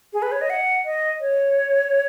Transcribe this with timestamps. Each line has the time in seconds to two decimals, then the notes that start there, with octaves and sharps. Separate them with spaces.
0.13 G#4
0.22 B4
0.32 C#5
0.41 D#5
0.50 F#5
0.85 D#5
1.21 C#5